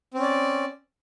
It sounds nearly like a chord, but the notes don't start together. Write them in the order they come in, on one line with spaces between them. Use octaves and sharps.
C4 C#4 D5